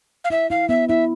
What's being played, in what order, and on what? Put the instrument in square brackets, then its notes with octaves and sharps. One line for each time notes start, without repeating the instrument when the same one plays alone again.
[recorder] F5
[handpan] E4 [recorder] E5
[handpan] E4 [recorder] F5
[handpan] B3 [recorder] E5
[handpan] E4 [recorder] E5